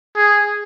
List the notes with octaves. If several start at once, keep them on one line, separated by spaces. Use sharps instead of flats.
G#4